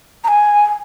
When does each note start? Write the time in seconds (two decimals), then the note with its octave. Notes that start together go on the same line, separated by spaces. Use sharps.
0.24 A#5
0.28 G#5
0.67 G#5